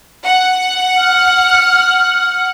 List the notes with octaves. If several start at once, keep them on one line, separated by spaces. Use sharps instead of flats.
F#5
F6